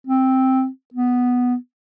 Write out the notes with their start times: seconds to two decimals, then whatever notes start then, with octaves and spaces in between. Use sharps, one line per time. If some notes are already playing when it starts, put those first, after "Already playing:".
0.07 C4
0.94 B3